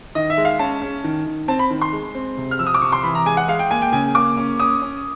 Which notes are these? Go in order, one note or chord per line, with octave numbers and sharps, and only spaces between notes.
D#3 D#5
E5
G#3
F5
C#4 A5
C#4
D#3
D#3
C4 A5
B5
D#3
C6
G#3
C4
C3
F6
F3 E6
D#6
D6
C3 C#6
C6
E3 B5
A#5
G#3 G#5
F#5
G#3 F5
G5
A#3 G#5
G5
C#3 G#5
A#3 D6
C#4
C#4 D#6
C#4